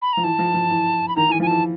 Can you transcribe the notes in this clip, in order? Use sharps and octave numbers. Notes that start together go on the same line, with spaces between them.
B5
F3 A#5
E3 A5
F3
F3
E3
B5
D#3 A#5
E3
G#5
F3
G#5
E3 A5